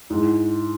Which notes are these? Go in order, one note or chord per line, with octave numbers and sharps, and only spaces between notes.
G#2 E4